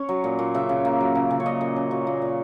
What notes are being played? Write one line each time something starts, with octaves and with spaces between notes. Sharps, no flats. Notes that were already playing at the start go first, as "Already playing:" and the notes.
Already playing: C#4 C#5
F#3
A#2
A#2
C#3 E5
C#3
A#3
F#3
C#3
C#3
C#5
A#2 D#5
A#2
C#4
F#3
A#2
A#2